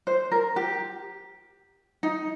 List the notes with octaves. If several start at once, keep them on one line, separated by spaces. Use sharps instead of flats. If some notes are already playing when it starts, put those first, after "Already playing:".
C5
A#4
G4
D#4